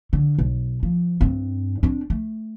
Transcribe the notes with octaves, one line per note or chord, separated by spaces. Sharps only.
D3
B1
F3
G2 C4
C4 D4
A3